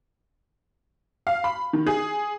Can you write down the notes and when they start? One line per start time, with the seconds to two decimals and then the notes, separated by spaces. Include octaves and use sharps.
1.27 F5
1.44 B5
1.73 D#3
1.87 G#4